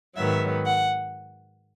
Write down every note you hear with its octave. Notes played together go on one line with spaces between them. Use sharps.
G#2 D#3 F#3 B3 E5
F#5